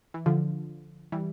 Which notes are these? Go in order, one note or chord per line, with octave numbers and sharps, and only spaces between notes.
E3
D3 F3
E3 G3